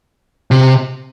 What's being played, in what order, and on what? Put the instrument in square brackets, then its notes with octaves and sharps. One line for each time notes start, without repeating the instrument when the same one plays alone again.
[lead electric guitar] C3